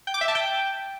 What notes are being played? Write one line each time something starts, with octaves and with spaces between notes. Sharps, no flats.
G5
D6
E5
A5
G5